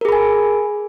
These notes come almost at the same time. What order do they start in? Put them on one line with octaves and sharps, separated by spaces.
A#4 G#4 B5 G#5